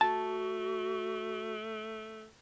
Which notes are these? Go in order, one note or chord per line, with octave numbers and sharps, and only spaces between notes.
A3 F#4 A5